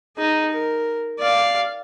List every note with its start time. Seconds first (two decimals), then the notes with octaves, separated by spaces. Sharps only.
0.17 D#4 G#4
0.51 A#4
1.19 D5 F5